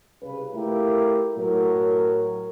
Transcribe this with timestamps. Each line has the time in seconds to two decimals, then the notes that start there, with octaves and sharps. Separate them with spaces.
0.22 C2 C#3 B4
0.53 A3 E4 F4 G4 A#4
1.37 A2 F#3 A#4